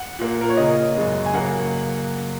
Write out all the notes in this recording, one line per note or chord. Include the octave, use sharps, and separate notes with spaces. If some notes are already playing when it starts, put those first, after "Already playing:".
Already playing: F#5
A#2 A#3
A#4
C#5
C#3 A#3 D#5
F#2 C#3 G#3
G#5
C#3 F#3 A#3 F#5